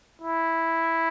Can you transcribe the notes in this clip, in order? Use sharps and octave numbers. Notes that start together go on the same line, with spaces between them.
E4